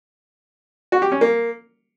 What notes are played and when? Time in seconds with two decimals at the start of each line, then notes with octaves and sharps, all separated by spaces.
0.92 F#4
1.02 G4
1.12 C#4
1.21 A#3